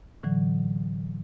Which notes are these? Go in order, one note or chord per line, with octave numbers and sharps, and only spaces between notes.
A2 D3 E3 F#3